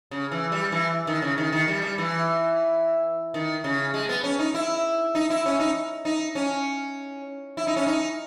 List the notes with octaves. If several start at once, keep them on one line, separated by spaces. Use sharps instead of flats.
C#3
E3
G3
E3
D#3
C#3
D#3
D#3
G3
G3
E3
D#3
C#3
G#3
B3
C#4
D#4
E4
D#4
E4
C#4
D#4
D#4
C#4
E4
D#4
C#4
D#4